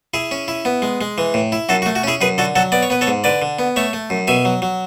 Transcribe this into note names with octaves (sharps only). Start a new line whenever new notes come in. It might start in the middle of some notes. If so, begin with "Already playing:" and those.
E4 G#4
C#4
E4
B3
G#3
G#3
E3
A2
E4
F#2 F#4 A4
F#4
A3
F#4
C#4 E4 G#4
F#2 G#4 B4
D3 F#4 A4
F#3 F#4 A4
B3 D5
C#5
B3 B4
A4 C#5
G#2
D3 B4 D5
D3
B3
A3 C#5 E5
A3
F#2
B2 E5 G#5
F#3
F#3